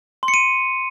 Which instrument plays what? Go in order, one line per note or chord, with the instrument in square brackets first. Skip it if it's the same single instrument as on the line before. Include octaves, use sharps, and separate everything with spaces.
[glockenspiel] C6
C#7
D#7